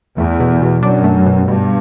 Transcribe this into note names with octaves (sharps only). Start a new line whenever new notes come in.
E2 A3
B2
B2
F#2 D4
A3
B2
G2 B2